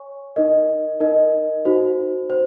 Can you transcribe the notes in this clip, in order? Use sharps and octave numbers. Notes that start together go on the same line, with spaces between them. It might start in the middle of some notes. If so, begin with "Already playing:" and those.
Already playing: C#5 G#5 C#6
D#4 A#4 D#5
D#4 A#4 D#5
D#4 F#4 C5
C5